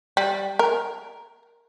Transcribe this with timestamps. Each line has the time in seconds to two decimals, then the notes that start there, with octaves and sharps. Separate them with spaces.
0.17 G3
0.59 A#4